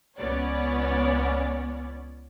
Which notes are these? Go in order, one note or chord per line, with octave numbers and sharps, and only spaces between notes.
C#2 B3 C#4 C#5 D5